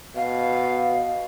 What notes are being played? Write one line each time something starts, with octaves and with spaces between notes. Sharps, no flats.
B2 F5